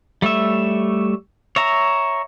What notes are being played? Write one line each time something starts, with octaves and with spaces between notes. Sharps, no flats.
G3 A3 C#5 E5
C#5 E5 A#5